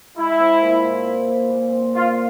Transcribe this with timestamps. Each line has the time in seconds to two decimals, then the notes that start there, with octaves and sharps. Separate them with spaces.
0.18 G#3 E4
0.40 C4
0.62 A#2
0.85 A#2
1.06 C4
1.28 A#2
1.50 A#2
1.72 C4
1.94 A#2 F4